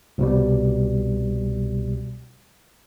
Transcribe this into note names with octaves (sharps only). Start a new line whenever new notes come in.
C2 B2 G3